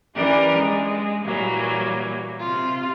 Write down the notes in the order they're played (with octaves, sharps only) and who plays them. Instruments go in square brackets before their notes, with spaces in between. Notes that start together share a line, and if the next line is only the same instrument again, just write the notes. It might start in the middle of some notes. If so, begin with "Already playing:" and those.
[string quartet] E3 C#4 D4 G4 A#4
G#3
A#2 E3 F#3 G3 A#3
C3 F4